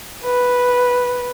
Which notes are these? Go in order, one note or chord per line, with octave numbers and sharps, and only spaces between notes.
B4